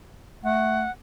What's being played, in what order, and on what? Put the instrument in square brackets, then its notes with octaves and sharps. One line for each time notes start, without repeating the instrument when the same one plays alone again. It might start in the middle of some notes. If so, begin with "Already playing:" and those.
[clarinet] A3 [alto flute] F#5